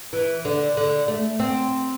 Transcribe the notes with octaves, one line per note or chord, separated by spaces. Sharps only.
E3
D3
D3
A3
C4